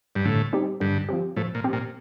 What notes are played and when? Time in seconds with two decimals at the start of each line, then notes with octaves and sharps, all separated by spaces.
0.15 G2
0.25 A2 D3
0.53 G3 C4 D#4 G4
0.80 G2 D3
1.09 F3 C4 G4
1.36 A2 F3
1.55 A#2
1.64 C4 G4
1.73 A#2